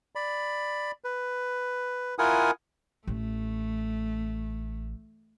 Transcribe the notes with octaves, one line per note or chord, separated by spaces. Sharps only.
D5 B5
B4
E4 F4 A#4 F#5 G#5 D#6
A1 A3